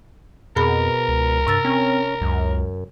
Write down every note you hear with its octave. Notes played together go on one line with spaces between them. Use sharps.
F2 B2 G#4 A#4 B5
C#2
G2 C3 E6 A6
C4 C#4
C#2 F#2